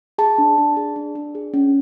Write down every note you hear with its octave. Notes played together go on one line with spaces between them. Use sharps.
G#4 A5
D4
D4
G#4
D4
D4
G#4
C#4